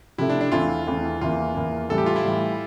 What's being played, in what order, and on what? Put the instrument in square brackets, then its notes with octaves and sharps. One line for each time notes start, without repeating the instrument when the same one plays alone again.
[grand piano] C3 F3 A3 [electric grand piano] E4
[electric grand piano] D4
D4
[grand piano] E2 E3 A3 C4 E4 [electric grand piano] F4
[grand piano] E2 E3 A3 C4 E4
[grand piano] E2 E3 A#3 [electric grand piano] F4
[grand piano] E2 E3 A#3
[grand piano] A2 E3 G3 [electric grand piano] A4
[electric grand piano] G4
F4
E4
[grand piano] A2 E3 G3